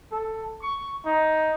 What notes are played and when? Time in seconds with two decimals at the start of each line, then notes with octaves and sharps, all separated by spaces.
0.12 A4
0.62 C#6
1.06 D#4